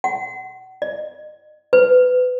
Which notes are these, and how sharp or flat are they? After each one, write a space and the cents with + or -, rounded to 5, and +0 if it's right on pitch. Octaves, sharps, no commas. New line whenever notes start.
F#5 +30
D#5 -40
B4 +30